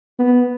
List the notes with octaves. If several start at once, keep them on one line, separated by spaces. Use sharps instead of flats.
B3